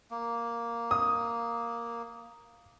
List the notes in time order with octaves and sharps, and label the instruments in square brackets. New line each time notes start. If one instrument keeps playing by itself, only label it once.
[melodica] A#3
[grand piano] D#6